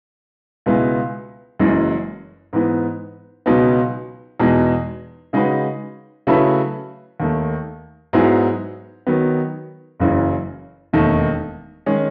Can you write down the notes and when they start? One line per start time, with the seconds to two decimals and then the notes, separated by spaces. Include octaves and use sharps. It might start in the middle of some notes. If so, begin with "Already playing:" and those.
0.66 C#2 B2 G#3 B3 E4
1.59 F#1 F#2 E3 G#3
2.53 G#2 E3 B3
3.46 C#2 B2 F#3 B3 D#4
4.40 E2 B2 G#3 D#4
5.33 C#3 G#3 D#4 F#4 B4
6.27 C#3 F#3 A3 E4 B4
7.20 D#2 D#3 A3
8.13 G#2 F#3 B3 E4 G#4
9.07 D#3 F#3 B3
10.00 F#1 F#2 C#3 E3
10.93 E1 D#2 D#3 A3 D#4
11.86 D#3 G#3 C#4